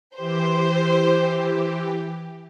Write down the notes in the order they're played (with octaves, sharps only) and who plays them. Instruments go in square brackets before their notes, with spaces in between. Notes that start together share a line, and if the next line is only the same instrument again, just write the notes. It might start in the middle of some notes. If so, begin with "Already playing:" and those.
[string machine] E3 G4 [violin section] C5